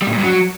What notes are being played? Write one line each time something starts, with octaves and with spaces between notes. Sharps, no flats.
G3
A2
A#2
G2
F#3